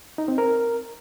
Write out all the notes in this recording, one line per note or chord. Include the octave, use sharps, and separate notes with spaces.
D#4
C4
A#4